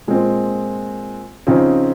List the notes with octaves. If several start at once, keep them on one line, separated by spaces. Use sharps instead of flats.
A#2 G#3 C4
C#3 F3 C4 D#4